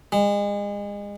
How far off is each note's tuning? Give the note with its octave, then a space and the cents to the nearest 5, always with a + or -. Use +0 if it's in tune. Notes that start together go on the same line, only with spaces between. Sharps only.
G#3 -35